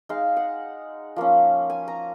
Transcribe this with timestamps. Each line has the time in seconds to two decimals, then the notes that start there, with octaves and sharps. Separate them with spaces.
0.09 G#3 D#4 F5
0.37 F#5
1.16 F3 A#3 C#4
1.70 G#5
1.88 A#5